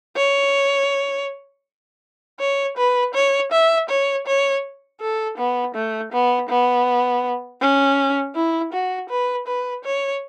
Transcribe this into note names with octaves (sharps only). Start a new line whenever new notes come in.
C#5
C#5
B4
C#5
E5
C#5
C#5
A4
B3
A3
B3
B3
C#4
E4
F#4
B4
B4
C#5